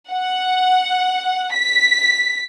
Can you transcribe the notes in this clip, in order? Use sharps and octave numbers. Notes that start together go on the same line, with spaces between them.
F#5
B6